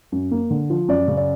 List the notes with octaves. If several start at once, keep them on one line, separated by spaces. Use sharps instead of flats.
F#2
A#3
D3
F3
F#2 D5
C#3
D5